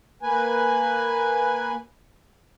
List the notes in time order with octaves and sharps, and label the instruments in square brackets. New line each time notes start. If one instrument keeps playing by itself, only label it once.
[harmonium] A#3 B4 G#5